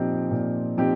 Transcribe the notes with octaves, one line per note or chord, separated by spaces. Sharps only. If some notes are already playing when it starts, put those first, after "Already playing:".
Already playing: A#2 F3 C4 D#4 G4
A#2
F3 C4 D#4 G4